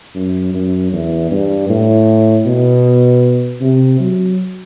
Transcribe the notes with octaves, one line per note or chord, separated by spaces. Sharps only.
F#2
F#2
E2
G2
A2
B2
C3
F#3